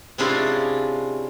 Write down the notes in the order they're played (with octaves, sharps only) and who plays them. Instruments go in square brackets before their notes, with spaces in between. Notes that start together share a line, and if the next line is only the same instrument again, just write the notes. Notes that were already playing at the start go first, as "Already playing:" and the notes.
[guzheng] C3 G#3 C#4 D4 E4 F4